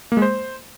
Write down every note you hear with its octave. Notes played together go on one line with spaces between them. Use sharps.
A#3
G#3
C5